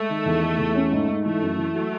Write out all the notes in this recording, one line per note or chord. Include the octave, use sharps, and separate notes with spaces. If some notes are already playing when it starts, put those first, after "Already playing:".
Already playing: G#3 A3
D#3
E2
D#4
E2
C#4
G#2
G#2
E3 A3
F#2
E3
F#3